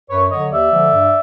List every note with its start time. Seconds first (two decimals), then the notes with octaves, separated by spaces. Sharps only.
0.10 F#2 B4 C#5
0.30 D3 F#3 C#5 D#5
0.51 D#2 D5 E5
0.71 D3 F3 G#3
0.92 G2